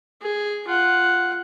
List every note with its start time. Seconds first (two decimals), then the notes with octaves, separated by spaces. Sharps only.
0.22 G#4
0.67 F4 F#5